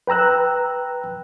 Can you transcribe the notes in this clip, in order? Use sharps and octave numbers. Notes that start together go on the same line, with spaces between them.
B4 G5 A#5 E6 F#6